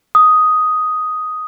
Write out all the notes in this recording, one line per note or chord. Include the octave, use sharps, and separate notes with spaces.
D#6